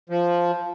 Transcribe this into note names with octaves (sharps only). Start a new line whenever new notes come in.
F3